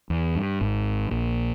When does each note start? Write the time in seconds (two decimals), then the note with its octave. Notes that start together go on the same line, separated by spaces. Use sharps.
0.10 E2
0.36 G2
0.61 G#1 G#2
1.11 A#1 A#2